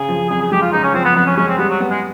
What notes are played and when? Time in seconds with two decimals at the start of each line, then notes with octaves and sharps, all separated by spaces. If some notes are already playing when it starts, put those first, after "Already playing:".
Already playing: C#3 G#4
0.09 F3
0.30 F2 G#4
0.41 G#4
0.52 G#3 G4
0.62 F4
0.72 C#3 D#4
0.83 C#4
0.94 F3 C4
1.05 B3
1.16 F2 B3
1.26 C#4
1.37 G#3 C#4
1.48 C4
1.58 G3 B3
1.70 F#3
1.80 B3
1.91 G#3